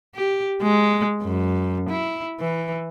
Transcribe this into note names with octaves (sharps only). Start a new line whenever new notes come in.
G4
G#3
F#2
E4
E3